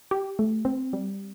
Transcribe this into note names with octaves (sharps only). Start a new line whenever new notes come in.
G4
A3
C4
G3